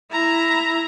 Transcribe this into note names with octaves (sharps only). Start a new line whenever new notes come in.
E4 A#5